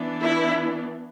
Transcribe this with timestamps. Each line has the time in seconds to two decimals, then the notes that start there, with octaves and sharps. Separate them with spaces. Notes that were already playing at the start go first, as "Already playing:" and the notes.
Already playing: E3 B3 D4
0.21 E4